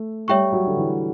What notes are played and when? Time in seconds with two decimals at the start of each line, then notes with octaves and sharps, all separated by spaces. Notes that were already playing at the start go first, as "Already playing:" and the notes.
Already playing: A3
0.28 G3 C#5 E5 G5 C#6
0.52 F#3
0.67 D3
0.77 E3